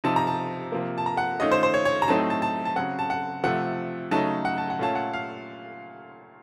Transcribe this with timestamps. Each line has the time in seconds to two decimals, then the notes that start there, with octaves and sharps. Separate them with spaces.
0.04 C3 F3 C4 D#4 A5
0.16 A#5
0.27 A5
0.72 C3 F3 A#3
0.98 A5
1.06 A#5
1.17 F#5
1.40 D#3 A3 C#4 F4 D#5
1.51 C5
1.63 C5
1.74 C#5
1.85 C#5
2.02 A#5
2.08 A2 F#3 A3 C4 D#4 A5
2.30 A5
2.42 A5
2.65 A5
2.76 C#3 F#3 C4 F#5
2.99 A5
3.10 F#5
3.44 C3 F3 A3 F#5
4.11 C#3 F#3 A3 D#4 A5
4.45 F#5
4.58 A5
4.70 F#5
4.79 A#2 A3 C#4 F4 A5
4.95 F#5
5.13 F5